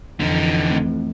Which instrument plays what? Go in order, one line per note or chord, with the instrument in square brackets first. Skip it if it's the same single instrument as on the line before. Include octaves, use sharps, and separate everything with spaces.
[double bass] F2 E3 [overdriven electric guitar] D3 D#4
[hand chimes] A3 C4